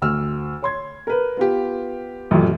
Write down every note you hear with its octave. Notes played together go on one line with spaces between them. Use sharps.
D2 E6 F6
C#5 C6 G#6
A#4 B4
B3 F4 G4
A1 F#2 A#2 A3